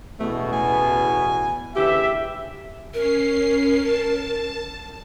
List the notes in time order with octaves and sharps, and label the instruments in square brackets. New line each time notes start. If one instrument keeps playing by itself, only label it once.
[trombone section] A1 E2 B2 [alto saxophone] A3
[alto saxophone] G#5
[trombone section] D2 C#3 E3 [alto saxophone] G4 [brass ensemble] E5
[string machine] C#4 C7 [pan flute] A#4
[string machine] A5